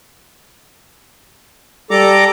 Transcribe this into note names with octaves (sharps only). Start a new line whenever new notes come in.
G3 A4 A#5 D6